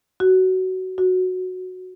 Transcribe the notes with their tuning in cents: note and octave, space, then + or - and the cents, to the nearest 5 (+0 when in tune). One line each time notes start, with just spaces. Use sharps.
F#4 +15
F#4 -5